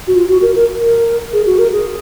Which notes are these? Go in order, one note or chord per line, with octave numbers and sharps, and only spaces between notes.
F#4
F4
F#4
A#4
A#4
A#4
G#4
F#4
A#4
G#4